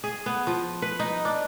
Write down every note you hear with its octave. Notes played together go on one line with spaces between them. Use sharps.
G#4
B3
F3
B4
D#4
D4